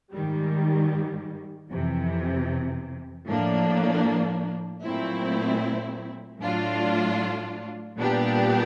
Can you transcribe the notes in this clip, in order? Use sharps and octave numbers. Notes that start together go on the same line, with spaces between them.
G#2 D#3 G3
F2 C3 E3
A2 F3 A#3 D4
A#2 F#3 A3 C4 E4
A2 F#3 A3 D4 F4
A#2 G3 B3 D4 G4